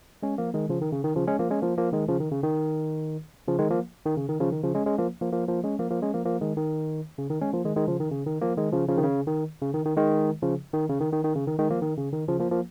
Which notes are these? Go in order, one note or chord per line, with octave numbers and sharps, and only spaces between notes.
G#3 C#4
F3 A#3
D#3 G#3
C#3 F3
D#3
C#3
D#3
C#3 F3
G#3 C#4
F3 A#3
G#3 C#4
F3 A#3
F3 A#3
D#3 G#3
C#3 F3
D#3
C#3
D#3
C#3 F3
D#3 G#3
F3 A#3
D#3
C#3
D#3
C#3 F3
D#3
C#3 F3
G#3 C#4
G#3 C#4
F3 A#3
F3 A#3
F3 A#3
F3 A#3
G#3 C#4
F3 A#3
F3 A#3
G#3 C#4
F3 A#3
F3 A#3
D#3 G#3
D#3
C#3
D#3
G#3 C#4
F3 A#3
D#3 G#3
D#3 G#3
C#3 F3
D#3
C#3
D#3
F3 A#3
D#3 G#3
C#3 F3
C#3 F3
D#3
C#3
D#3
C#3
D#3
D#3
D#3 G#3
C#3 F3
D#3
C#3
D#3
D#3
D#3
C#3
D#3
D#3 G#3
F3 A#3
D#3
C#3
D#3
C#3 F3
F3 A#3
F3 A#3